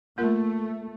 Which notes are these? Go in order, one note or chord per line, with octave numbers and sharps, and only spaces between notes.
A3 A#3 F4 A#4